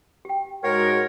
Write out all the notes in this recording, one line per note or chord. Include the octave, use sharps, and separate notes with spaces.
G4 G5
G#2 G#3 F#4 A#4 C#5 F#5